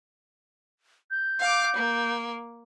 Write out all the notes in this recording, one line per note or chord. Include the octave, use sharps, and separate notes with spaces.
G6
F5 D6
A#3